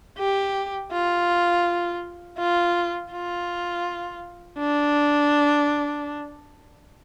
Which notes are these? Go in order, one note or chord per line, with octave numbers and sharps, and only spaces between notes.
G4
F4
F4
F4
D4